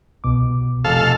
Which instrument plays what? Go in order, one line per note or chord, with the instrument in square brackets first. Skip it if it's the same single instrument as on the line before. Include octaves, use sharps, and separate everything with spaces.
[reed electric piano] C2 B2 D6
[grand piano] F1 [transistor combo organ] A4 F5